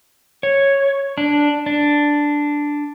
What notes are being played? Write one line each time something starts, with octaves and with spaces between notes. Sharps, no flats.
C#5
D4
D4